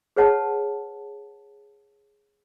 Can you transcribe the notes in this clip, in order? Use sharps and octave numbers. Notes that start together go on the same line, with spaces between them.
G#4 B4 C#5 F#5 A5